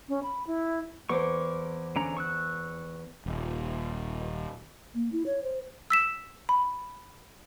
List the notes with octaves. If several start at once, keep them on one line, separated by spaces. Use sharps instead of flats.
C#4
B5
E4
E2 C5 C#6 D6
D3 C#4 A#5
C#6 E6 F#6
D#1
A#3
E4
C#5
C5
E6 B6 E7
B5